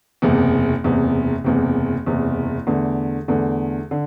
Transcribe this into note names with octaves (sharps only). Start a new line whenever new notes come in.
F#1 E2 C3
F#1 E2 C3
F#1 E2 C3
F#1 E2 C3
E2 D3 A3
E2 D3 A3
D3